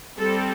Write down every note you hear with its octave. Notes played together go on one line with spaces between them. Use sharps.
G3 C4 A4